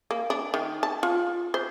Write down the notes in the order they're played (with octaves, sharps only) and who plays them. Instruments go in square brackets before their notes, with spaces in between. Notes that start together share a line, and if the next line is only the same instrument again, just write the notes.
[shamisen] A#3
D4
D#3
A5
F4
C5